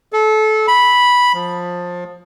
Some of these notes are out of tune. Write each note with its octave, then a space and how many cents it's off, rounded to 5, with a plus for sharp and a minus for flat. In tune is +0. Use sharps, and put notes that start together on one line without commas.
A4 -25
B5 -5
F3 +20